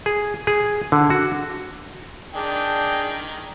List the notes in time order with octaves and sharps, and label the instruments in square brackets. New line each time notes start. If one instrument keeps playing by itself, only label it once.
[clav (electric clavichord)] G#4
G#4
D3
F#4
[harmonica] D#3 [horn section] D4 G#4 [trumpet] G5